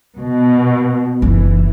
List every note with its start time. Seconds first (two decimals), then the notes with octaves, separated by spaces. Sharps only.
0.19 B2
1.22 F#1 E3 D#4